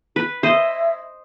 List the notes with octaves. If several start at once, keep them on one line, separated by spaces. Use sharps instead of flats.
B4
C5 D#5 E5